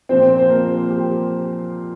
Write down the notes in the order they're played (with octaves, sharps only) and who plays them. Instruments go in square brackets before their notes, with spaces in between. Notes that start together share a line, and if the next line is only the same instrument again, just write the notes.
[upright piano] A#2 F3 C4 C5
C5
A#3 A#4
G4